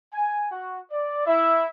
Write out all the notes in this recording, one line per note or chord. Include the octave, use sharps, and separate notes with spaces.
G#5
F#4
D5
E4 E5